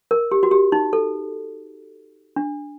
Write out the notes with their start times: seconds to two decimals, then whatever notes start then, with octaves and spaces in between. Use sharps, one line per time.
0.11 A#4
0.31 G4
0.43 F#4
0.51 G4
0.72 D#4
0.93 A4
2.36 D4